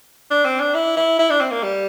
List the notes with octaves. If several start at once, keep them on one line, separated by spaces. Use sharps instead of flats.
D4
C4
D4
E4
E4
E4
D4
C4
A#3
G3